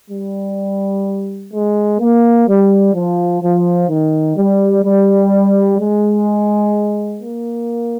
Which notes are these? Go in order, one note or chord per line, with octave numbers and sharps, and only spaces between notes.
G3
G#3
A#3
G3
F3
F3
D#3
G3
G3
G#3
A#3